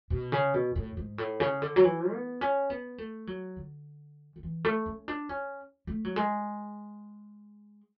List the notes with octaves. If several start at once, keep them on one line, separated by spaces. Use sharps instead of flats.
B2
C#3
B2
A2
G#2
A2
C#3
D3
F#3
E3
B3
C#4
B3
A3
F#3
D3
D3
E3
A3
C#4
D4
C#4
A3
F#3
G#3